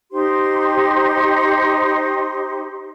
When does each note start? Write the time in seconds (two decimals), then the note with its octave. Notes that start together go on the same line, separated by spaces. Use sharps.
0.12 D#4 G4 C5 C6